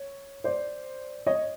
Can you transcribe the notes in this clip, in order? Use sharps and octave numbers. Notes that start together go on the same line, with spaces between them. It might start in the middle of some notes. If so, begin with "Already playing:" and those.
Already playing: C#5
C5 D5
C#5 D#5